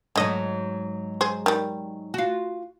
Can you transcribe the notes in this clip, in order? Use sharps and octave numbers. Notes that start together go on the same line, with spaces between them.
G#2 D3 F#3 D#5
G#4 C5
D#3 G3
F4 F#4